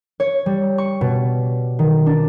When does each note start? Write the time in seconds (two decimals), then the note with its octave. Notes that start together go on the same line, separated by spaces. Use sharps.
0.20 C#5
0.46 G3
0.78 C#6
1.01 B2
1.79 D#3
2.06 D4